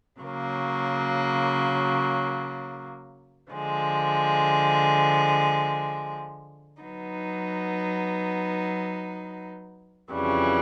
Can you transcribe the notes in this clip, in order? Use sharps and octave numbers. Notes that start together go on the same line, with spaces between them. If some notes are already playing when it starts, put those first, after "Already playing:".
C#3 F#3 A#3
D3 F3 G#3
F#3 B3 D#4
F2 C#3 E3 G3